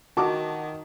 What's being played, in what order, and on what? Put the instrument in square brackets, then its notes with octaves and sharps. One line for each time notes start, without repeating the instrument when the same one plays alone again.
[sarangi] D#3 [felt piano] F#4 [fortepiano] A5 D6